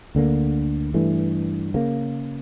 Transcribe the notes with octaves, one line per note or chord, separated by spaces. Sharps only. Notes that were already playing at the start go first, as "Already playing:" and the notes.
D2 D3 G3 A#3
G2 E3 A3
C#3 F3 A#3